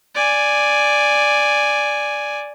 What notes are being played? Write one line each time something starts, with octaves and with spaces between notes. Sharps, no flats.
D5 G#5